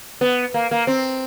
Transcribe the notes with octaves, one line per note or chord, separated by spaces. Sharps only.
B3
A#3
A#3
C4